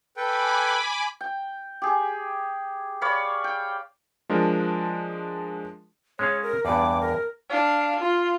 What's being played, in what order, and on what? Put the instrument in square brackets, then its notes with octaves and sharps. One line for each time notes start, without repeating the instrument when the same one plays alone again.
[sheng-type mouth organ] A4 B4 G5 [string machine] G#5 B5 D6
[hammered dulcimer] G5
G4 G#4
C#5 D5 F5 B5
G5
[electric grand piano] F3 G#3 D4 A#4
[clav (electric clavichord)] G#3 C#4 F5 [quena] C#5
[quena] A#4
[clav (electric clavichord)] E2 G2 [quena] D6
[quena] A#4
[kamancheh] D4 F5
F4